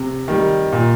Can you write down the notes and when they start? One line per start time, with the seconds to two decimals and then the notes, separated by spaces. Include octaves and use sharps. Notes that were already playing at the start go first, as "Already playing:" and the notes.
Already playing: C3
0.28 D#3 G3
0.72 A#2